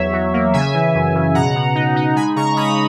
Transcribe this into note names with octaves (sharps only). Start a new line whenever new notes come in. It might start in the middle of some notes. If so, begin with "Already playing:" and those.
Already playing: E2 F#3 C#5 E5
F#3
A#3
C#3 E5 G#5
E3
F#2
C#3
B2 F#5 A#5
B2
D#4
D#4
G#3 G#5 B5
C#3 A#5 C#6
C#3 B5 D#6